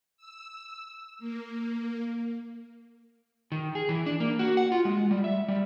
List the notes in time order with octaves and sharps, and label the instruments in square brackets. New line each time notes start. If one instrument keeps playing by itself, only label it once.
[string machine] E6
A#3
[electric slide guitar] D#3
G#4
E3
D4
A#3
F#4
F#5
F4
G#3
G3
E5
G3